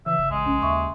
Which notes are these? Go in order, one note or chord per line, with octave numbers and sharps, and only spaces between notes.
C#3 E3 E5
G1
A1 G#3
A#1 C#4
D#2 E5 C#6